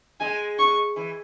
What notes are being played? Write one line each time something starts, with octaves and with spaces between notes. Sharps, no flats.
G#3 G#5
C#6
E3